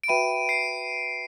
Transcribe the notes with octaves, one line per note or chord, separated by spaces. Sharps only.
D7
F#4 B4 E5 G5 B5 D#7
C7